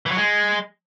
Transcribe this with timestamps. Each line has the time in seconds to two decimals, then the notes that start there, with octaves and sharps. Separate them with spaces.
0.06 E3
0.11 F#3
0.17 G#3